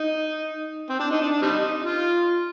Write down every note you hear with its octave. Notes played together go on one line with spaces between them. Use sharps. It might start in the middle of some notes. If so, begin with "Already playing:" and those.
Already playing: D#4
C4
D4
D#4
D4
D4
G3 C4 D#4
F4